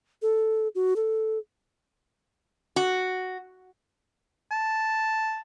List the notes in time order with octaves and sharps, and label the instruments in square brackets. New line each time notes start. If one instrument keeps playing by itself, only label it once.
[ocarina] A4
F#4
A4
[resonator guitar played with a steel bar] F#4
[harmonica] A5